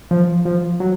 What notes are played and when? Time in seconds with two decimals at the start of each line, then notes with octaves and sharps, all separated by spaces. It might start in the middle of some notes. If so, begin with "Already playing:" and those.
0.11 F3
0.45 F3
0.80 F#3